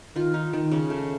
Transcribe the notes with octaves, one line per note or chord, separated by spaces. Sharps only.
D#3 F4
D#4
D#3
C#3
A3